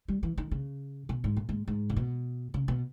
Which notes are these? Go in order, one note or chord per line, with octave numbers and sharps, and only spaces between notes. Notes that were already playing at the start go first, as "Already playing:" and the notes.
G3
E3
D#3
C#3
B2
G#2
A#2
G#2
G#2
C#3
B2
C#3
B2